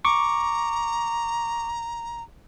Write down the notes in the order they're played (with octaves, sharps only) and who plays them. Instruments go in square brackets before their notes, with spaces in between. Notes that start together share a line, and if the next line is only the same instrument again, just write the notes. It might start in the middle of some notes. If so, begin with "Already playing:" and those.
[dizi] A#5 [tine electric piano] C#6 D6